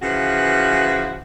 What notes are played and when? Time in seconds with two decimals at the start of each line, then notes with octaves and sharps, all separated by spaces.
0.02 C#3 E3 F3 F#4 B4